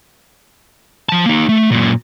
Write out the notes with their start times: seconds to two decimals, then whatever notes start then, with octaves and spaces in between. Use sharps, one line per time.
1.09 F3 A5
1.26 A#3 D#4
1.49 A3
1.72 F#2 A#2